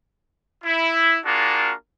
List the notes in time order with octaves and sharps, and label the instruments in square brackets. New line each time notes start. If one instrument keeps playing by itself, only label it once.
[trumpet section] E4
A#3 D4 F4 F#4 G#4 A#4